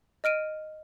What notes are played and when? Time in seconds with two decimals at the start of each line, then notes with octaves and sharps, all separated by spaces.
0.24 D#5 F6 D7 D#7